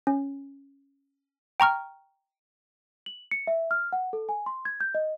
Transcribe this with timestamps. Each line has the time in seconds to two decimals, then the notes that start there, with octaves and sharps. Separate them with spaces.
0.07 C#4
1.60 G5 A#5 C#6 F6
3.06 F#7
3.31 C#7
3.47 E5
3.71 F6
3.93 F#5
4.13 A4
4.29 G#5
4.46 C6
4.65 G#6
4.81 G6
4.95 D#5